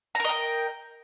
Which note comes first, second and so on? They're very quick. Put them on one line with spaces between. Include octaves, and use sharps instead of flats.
A#5 A#4 D#5 G5